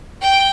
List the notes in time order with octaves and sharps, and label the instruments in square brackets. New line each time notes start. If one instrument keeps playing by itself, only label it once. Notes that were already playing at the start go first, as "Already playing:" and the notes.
[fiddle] G5